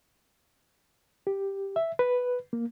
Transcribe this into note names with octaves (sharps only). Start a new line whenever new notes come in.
G4
E5
B4
A#3